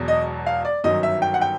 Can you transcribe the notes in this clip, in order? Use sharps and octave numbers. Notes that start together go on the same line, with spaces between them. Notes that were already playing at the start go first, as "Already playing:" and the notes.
Already playing: E1 E2 B2 F#3
D#5
F5
D5
G1 F#2 D#3 F#3 D#5
E5
G5
F#5
G5